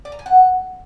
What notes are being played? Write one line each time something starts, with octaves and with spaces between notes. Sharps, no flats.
D5
A#5
G#5
F#5